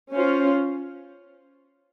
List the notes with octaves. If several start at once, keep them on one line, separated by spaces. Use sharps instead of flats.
C#4 F4 C5